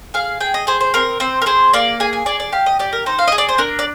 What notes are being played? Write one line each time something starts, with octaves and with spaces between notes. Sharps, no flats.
G#4 F5
G#4 G5
D#5
G#4 C5
C5
C4 A#4
C4 C5
A#4
G#4 C5
A#3 D5
G#4 G#5
G#5
G#4 D5
D5
G4 F5
D#5
G4 D5
A#4
D#4 C5
F5
G#4 D#5
D5
C5
D4 A#4
D5